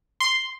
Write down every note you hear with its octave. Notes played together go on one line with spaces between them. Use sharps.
C6